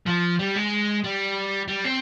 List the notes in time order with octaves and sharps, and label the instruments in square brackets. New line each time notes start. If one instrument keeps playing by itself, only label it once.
[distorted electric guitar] F3
G3
G#3
G3
G3
C4